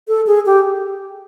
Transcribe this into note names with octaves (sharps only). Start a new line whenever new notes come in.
A4
G#4
G4